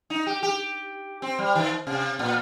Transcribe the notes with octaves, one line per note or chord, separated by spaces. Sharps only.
D#4
G4
G4
C4
G3
D#3
C3
A#2